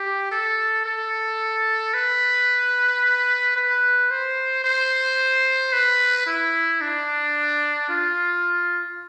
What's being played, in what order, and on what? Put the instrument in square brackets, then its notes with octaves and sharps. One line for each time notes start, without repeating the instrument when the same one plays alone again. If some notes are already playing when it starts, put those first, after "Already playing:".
Already playing: [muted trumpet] G4
A4
A4
B4
B4
C5
C5
B4
E4
D4
F4